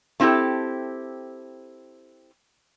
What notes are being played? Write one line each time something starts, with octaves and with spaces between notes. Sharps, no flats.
A3 C4 E4 F#4 G4 A4